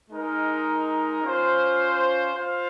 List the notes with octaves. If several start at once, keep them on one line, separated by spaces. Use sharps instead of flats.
G#3 D#4 A#4
C#4 F4 C5 F5
F4 C5 F5